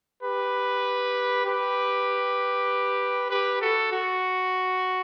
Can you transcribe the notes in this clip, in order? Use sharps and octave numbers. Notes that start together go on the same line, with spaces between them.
G4 B4
G4 B4
G4 B4
F#4 A4
F#4